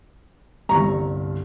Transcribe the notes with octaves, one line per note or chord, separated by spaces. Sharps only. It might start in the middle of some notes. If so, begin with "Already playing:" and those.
G1 C2 G2 A#5 C#6